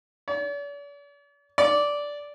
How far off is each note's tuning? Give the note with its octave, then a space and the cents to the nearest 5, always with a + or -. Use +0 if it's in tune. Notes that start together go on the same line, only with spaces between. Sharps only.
D5 -45
D5 -10